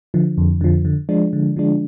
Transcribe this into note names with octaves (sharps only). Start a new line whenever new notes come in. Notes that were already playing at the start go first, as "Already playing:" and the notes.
D3 F3
F2
D3 F3
D3
F3 G#3 D4
D3
F3 G#3 D4